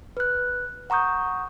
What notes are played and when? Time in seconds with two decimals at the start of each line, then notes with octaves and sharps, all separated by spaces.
0.17 B4 F#6
0.90 F#5 A#5 C#6 D#6 G6